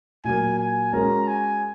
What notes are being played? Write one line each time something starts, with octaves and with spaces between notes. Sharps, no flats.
A#2 F#3 A#3 G#5
G#5
G#3 C#4 F#4 A#4 A#5
G#5